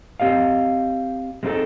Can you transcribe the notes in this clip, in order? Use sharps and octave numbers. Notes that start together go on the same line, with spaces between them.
C4 G4 D#5 F5
G#3 A#3 C4 D#4 G#4 A4